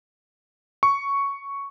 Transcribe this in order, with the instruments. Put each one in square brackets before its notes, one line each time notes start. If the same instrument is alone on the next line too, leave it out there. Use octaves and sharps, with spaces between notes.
[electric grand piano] C#6